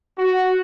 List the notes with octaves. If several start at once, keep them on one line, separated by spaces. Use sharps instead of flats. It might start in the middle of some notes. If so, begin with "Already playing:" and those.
F#4